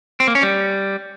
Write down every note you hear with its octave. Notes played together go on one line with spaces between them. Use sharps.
C4
A#3
C#4
G3